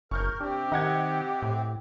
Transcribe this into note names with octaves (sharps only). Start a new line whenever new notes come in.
F#1 A#4 C#6 F6 G6
C3 C4 D4 G4
D#3 D#5 F#5 G#6
A2